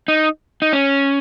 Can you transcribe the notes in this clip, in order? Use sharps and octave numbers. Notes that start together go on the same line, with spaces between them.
D#4
D#4
C#4